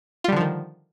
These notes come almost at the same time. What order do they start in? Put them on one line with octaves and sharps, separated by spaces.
F4 G3 D3 F3 D#3